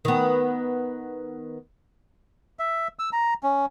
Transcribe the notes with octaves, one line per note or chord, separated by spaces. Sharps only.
D#3 B3
E5
E6
A#5
C#4